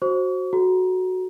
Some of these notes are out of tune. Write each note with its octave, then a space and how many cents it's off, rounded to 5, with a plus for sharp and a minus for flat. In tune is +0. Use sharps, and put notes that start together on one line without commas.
F#4 +0 C5 +20 C#6 +40
F#4 +0 A4 -40 A#5 +20